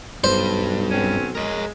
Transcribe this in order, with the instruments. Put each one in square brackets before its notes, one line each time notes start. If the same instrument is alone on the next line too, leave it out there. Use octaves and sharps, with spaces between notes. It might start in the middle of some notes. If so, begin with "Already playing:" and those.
[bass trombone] B1 [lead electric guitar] G2 [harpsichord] C5
[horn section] F#3 C4 C#4
[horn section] G#3 [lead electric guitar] A#4 C#5